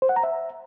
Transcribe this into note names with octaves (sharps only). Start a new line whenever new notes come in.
C5
F#5
A#5
E5